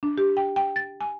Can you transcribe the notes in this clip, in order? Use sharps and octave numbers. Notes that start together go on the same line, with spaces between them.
D4
G4
G5
G5
A6
G#5